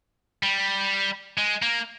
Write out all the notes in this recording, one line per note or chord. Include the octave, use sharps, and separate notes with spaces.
G3
G#3
A#3